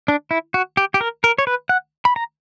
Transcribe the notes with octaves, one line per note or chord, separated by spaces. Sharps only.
D4
E4
F#4
G4
G4
A#4
A#4
C#5
B4
F#5
B5
A#5